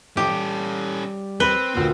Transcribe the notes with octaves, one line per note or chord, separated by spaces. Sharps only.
A2 F3 C#4 G4 A4 D#5
G3
C4 B4 G7
D2 A#2 C4